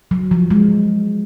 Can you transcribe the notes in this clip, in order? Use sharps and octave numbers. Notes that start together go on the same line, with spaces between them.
F#3
F3
G#3